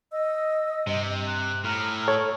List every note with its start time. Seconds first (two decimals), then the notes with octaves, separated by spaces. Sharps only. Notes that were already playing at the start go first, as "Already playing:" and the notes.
0.12 D#5 E6
0.87 G2 C3
1.27 F#6
1.64 A2 A#5 F6
2.08 A4 C#5